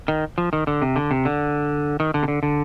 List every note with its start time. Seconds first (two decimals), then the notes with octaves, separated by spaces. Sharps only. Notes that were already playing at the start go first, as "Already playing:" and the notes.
0.08 D#3
0.38 F3
0.53 D#3
0.67 D3
0.82 C3
0.96 D3
1.11 C3
1.25 D3
2.00 D#3
2.14 D3
2.23 C3
2.28 D3
2.43 D3